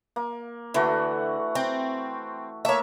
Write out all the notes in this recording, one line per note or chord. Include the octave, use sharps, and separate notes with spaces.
A#3
D3 E3 A3 F#4
C4
A3 A#3 C#5 E5